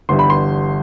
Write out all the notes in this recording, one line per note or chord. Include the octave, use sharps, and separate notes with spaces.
G1 G2 E3 G3 C6
B5
C6